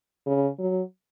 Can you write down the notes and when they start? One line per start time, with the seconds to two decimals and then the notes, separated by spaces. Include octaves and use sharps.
0.26 C#3
0.58 F#3